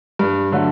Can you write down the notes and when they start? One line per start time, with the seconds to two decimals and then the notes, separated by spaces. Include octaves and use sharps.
0.19 G2
0.52 D3 F#3 A3